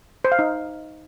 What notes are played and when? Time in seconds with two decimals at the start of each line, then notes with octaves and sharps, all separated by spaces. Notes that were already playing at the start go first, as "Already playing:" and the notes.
0.25 C5
0.32 F5
0.39 D#4